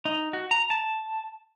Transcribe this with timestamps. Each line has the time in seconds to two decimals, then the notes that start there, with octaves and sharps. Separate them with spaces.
0.05 D#4
0.33 F#4
0.51 A#5
0.70 A5